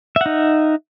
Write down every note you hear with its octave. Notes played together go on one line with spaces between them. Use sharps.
D#4 E5 F#5